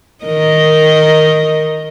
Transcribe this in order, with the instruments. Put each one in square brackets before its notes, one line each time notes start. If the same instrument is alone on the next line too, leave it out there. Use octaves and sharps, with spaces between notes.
[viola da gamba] D#3 A#4 D#5